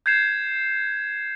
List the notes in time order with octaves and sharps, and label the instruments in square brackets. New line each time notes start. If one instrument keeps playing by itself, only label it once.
[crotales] G6 G#6 C7 E7